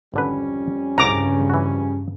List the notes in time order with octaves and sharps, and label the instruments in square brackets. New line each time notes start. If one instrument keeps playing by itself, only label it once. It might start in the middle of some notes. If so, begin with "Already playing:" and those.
[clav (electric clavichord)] G#1 D3 B4 [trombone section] F2 G3 C#4
[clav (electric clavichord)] C2 F#5 [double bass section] G2 C#3 [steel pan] A#5 D6
[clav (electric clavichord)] E3 F#4